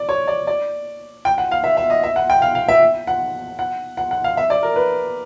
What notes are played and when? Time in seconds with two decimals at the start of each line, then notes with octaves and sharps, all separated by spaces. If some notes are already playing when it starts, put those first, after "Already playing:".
Already playing: D5
0.09 C#5
0.28 D5
0.47 D5
1.25 G5
1.38 F#5
1.52 F5
1.64 E5
1.77 E5
1.90 D#5
2.03 E5
2.16 F#5
2.30 G5
2.42 F5
2.55 F5
2.68 E5
3.07 F#5
3.59 F#5
3.97 F#5
4.11 F#5
4.24 F5
4.37 E5
4.50 D5
4.63 A#4
4.76 B4